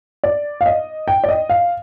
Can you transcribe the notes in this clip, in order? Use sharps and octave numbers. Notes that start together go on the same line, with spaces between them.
D5
F5
D#5
G5
D5
D#5
F5